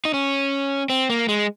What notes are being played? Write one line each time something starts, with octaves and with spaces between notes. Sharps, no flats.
D#4
C#4
C4
A#3
G#3